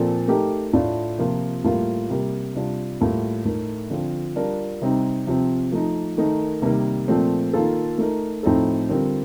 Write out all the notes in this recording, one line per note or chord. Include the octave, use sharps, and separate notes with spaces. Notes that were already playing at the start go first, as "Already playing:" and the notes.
Already playing: A#2 F3 C4 A4
A3 D#4 G4 A#4
A2 A3 D4 F4
C3 F3 A#3 F4
A2 G3 A#3 F4
C3 G3 A#3
C3 G3 D4 F4
A2 G3 A#3 F4
A2 A3 D#4 A#4
D3 F3 C4 F4
G3 D4 F4 A#4
C3 G3 C4 D#4
C3 F3 C4
F3 A3 D#4
D#3 A3 D#4 A#4
C3 D#3 G3 A#3
A#2 F3 A3 C4
D#3 A#3 F4 A4
A3 D#4 A#4
A2 F3 C4 D#4 A4
D3 G3 C4 F4 A#4